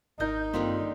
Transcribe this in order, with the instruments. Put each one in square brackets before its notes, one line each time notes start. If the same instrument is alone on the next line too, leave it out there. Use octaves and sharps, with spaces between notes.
[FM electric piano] G#1 G6 [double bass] D#4 [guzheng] A#4
[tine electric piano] G2 C4 F4 [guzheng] D3 D#3 G3 [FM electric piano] A#3